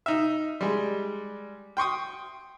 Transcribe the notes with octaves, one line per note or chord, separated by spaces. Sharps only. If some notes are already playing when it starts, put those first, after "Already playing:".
D#4 E5
G3 G#3
G5 C6 C#6 D#6